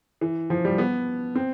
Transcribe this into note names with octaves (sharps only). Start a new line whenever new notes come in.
E3
F3
G3
B3
C4